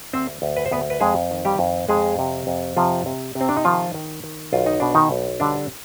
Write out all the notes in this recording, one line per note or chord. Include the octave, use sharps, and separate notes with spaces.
D2 C4 C5
D2
B4
C5
D2 B3 B4
B4
F2 G#3 G#4
D#3
G3 G4
F2
F2 G#3 G#4
C3
F2
C3 F3 F4
C3
C3
C4
D4
D#4
D#3 F3 F4
D#3
D#3
B1 F4
D#4
B2 D4
D#3 D#4
B1
D3 G3 D4